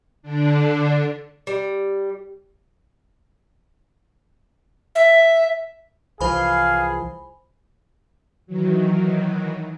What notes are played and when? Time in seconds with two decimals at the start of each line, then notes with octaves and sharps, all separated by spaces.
0.23 D3 D4
1.47 G3
4.95 E5
6.21 C2 E3 F3 G#4 C5 F5 G#5 B5
8.47 D#3 E3 F#3